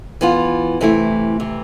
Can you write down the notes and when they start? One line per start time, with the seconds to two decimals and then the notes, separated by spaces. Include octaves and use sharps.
0.21 E3 B3 F4
0.81 C3 E3 A3 E4
1.40 C3 E3